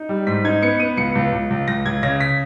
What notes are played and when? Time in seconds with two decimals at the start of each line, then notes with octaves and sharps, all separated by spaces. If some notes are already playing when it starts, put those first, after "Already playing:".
Already playing: D#4
0.09 G3
0.27 G#2 B6
0.44 D#4 G#6
0.62 B3 C#7
0.80 B3 D#7
0.97 C#2 C#7
1.15 C#2
1.32 C#2
1.50 C#2
1.68 C#2 A#6
1.85 C#2 G#6
2.03 C#3 A#6
2.20 B6